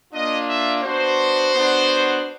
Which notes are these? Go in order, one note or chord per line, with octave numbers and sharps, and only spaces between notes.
A#3 D4 F4 D#5
E5
B3 D4 F#4 C5
B3 D4 F#4